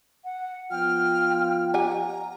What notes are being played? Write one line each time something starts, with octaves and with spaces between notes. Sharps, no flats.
F#5
F3 B3 F4 G5 F6
G4 F#5 G#5 A#5